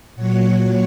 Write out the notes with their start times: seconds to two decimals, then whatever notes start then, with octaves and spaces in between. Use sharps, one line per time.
0.16 A#2 F#3 C#5 F#5